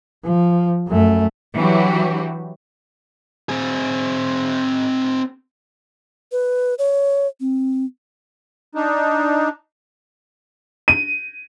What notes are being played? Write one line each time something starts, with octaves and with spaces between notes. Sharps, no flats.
F3
F#2 A3
E3 F#3 D4 F#4 G4
C4 G#4
B4
C#5
C4
D4 D#4
D#7